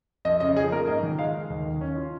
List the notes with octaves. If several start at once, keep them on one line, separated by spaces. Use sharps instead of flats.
F2 D#5
C#3 D#5
F3 G#4
A#3 A#4
G#2 D#5
D#3
G#3 F5
D#4
D#2
D#3
C#4
F4